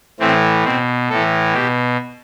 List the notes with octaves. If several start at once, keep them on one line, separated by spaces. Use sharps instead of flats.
A2 E3 C4
B2 C4
A2 E3 A4
B2 G4